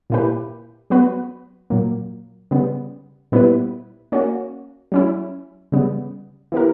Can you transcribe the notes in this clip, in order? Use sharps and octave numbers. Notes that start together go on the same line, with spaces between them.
A#2 A#3 E4 G4 B4
F#3 B3 F#4 B4
A#2 F#3 A#3
C#3 G3 B3
A#2 G3 B3 E4 B4
A#3 C#4 F#4
F#3 C#4 E4
C#3 G3 B3
E3 B3 E4 G4 A#4